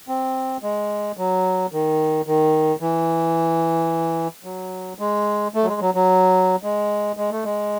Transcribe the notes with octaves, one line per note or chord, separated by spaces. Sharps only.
C4
G#3
F#3
D#3
D#3
E3
F#3
G#3
A3
F#3
G#3
F#3
F#3
G#3
G#3
A3
G#3